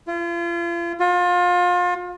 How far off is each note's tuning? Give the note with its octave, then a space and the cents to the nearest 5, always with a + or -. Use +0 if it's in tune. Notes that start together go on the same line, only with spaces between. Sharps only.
F4 -40
F4 +30